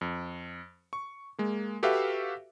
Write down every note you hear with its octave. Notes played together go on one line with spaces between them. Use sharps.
F2
C#6
G#3 A#3
F#4 G4 A4 B4 E5 F5